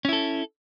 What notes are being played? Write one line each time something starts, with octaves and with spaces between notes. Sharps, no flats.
C#4 E4 A4